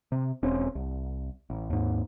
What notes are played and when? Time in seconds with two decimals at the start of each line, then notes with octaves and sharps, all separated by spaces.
0.12 C3
0.43 E1 C4 C#4
0.75 C2
1.50 A1
1.70 D#2 G#2